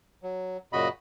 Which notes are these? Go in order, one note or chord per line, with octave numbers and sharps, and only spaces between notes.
F#3
F#2 A#2 C#3 F#4 D#5 B5